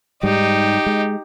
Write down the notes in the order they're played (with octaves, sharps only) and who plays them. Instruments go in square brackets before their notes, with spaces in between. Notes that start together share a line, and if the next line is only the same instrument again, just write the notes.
[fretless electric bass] G#2 G3 [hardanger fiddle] D#4 G4
[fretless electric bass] G#3